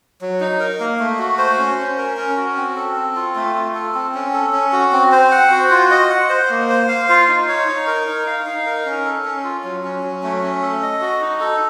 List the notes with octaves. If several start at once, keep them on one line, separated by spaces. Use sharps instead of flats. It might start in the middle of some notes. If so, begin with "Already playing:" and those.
F#3
D#4
A#4
A#3
A3
F#4
C5
C#4
C#4
A#4
C#4
F#4
C4
A4
C4
F4
A3
F4
A4
C4
C#4
A4
C#4
F#4
C4
C5
F#5
F#4
F4
D#5
F#5
C5
A#3
C5
F5
F4
D#4
C#5
D#4
A#4
D#4
F5
D#4
A#4
C#4
A4
C#4
F4
F#3
C#4
F#3
A3
C#4
A4
D#5
F#4
D#4
A4